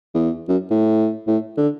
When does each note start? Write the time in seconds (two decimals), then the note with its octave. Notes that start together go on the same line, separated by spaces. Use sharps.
0.14 E2
0.49 F#2
0.71 A2
1.27 A2
1.57 D3